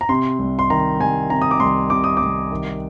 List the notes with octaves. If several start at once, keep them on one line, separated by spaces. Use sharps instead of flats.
A#5
C3 C6
C2
C6
D#3 A#5
C2 G#5
C3 A#5
D#6
D6
C2 C6
C3 D6
D#6
C2 D6
D#3